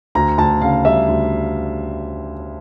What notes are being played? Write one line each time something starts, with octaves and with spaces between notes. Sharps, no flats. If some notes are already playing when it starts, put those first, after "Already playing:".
D2 A#5
D2 A5
C#3 F5
G3 E5
D2